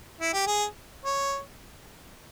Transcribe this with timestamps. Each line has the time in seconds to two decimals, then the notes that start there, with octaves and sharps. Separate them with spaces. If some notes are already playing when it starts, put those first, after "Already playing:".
0.21 E4
0.33 G4
0.47 G#4
1.05 C#5